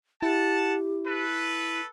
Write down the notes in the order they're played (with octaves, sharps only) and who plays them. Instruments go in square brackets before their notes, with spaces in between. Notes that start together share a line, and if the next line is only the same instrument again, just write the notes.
[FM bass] E4 [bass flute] G4 [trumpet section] F#5 A5
[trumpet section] A4 B4